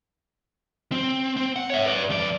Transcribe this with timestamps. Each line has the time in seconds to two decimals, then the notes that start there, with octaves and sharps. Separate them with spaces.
0.92 C4
1.36 C4
1.56 F#5
1.70 C#5 E5
1.86 B4 D5
2.10 F2 D5